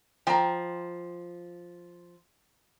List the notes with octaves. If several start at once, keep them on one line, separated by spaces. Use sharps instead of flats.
F3 G5 A#5